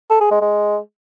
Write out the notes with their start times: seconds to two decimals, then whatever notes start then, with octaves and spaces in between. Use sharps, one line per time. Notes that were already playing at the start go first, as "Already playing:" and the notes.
0.10 A4
0.20 G#4
0.31 G#3
0.41 G#3